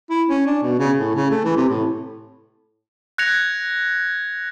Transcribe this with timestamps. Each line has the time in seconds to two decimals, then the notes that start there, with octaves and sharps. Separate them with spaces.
0.10 E4
0.29 C#4
0.47 D4
0.63 B2
0.80 C#3
0.99 A2
1.15 C#3
1.31 A3
1.44 E3
1.57 C3
1.69 A2
3.18 F#6 G#6 A#6 C#7 F7